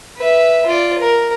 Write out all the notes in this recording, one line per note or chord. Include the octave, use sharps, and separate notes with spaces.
B4 E5
F4 D5
A#4